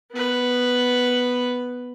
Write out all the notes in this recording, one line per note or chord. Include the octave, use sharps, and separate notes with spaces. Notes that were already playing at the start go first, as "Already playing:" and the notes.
B3 B4